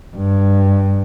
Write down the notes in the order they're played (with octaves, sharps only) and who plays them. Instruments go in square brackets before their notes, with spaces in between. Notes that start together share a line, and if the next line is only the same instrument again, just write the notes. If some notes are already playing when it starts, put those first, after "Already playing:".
[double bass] G2